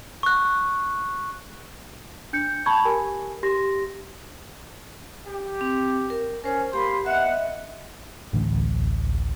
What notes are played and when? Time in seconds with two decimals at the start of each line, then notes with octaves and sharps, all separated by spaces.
0.23 C#6 F#6
2.33 D4 G6 C#7
2.66 A5 B5 C#6 G#6
2.85 G4 A#4 G#5
3.43 G4 C6 A#6
5.28 G4
5.61 C4
6.10 A#4
6.44 C#4 A#4 C5
6.73 A#3 G4 B5 C6
7.06 B3 D#5 E5 F#5
8.33 A1 D2